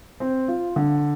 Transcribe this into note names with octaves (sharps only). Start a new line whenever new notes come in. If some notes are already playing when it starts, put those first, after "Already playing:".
C4
F4
D3